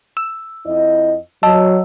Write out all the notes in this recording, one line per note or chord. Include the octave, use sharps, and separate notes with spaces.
E6
F2 E4 D#5
F#3 D#5 A5 E6